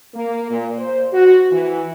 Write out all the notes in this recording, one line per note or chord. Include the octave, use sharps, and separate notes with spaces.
A#3
A#2
C5
F#4
E3